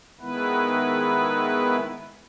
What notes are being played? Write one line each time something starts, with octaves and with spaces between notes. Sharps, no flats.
D#3 G#3 B3 E4 B4